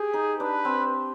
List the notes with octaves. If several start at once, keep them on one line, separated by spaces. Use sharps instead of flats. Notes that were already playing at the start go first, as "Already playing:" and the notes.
Already playing: G4 G#4
D#4
D4 B4
C4